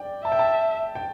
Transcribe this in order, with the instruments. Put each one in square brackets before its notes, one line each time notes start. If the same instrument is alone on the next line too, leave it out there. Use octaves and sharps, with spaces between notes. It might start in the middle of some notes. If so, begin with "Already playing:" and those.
Already playing: [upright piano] D5 G5
[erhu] E5 [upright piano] A5
[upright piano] G5
A5
G5